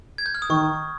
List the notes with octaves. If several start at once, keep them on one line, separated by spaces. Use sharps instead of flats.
G#6
G6
F6
D#6
D#3 C#6